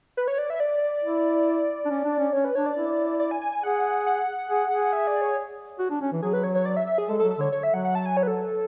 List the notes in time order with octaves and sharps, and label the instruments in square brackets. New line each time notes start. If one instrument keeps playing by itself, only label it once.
[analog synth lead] B4
C#5
D5
E5
D5
[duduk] E4
D4
C#4
D4
C#4
[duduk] C#4 [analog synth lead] C#5
[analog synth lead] B4
[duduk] D4 [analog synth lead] C#5
[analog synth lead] D5
[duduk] E4
[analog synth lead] D5
G#5
G#5
G#5
[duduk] G#4 [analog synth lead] F#5
[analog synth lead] F#5
[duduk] G#4
G#4
[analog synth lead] E5
D5
C#5
[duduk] F#4
D4
C#4
E3
[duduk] F#3 [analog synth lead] G#4
[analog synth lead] B4
C#5
C#5
D5
E5
E5
G#4
[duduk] G#3 [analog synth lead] A4
[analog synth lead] A4
[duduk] F#3
[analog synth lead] A4
[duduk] D3 [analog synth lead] C#5
[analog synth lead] C#5
E5
[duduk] F#3 [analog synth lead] F#5
[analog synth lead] F#5
A5
G#5
C#5
B4
A4